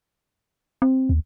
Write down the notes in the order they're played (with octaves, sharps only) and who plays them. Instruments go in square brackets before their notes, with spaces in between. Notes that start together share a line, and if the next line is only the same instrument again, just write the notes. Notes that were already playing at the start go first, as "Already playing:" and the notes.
[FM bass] C4
[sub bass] D#2